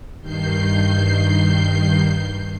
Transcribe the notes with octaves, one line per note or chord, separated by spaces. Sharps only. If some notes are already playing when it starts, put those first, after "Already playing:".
G2 D#3 G6 C7